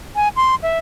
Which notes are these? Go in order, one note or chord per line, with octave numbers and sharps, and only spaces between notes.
G#5
C6
E5